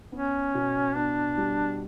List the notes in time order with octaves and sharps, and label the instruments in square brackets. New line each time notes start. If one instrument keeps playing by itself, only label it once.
[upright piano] B3 [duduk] C#4
[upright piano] B2
[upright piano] B3 [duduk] D4
[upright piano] G3